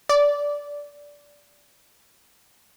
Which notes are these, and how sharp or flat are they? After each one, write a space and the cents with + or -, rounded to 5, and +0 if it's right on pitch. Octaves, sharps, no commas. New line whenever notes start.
D5 -15